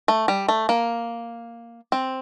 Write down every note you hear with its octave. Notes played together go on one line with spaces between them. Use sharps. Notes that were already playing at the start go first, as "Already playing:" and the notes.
A3
G3
A3
A#3
C4